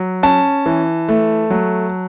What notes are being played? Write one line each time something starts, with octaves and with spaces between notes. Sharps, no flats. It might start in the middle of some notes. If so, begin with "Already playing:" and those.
Already playing: F#3
C#4 A5
E3
A3
F#3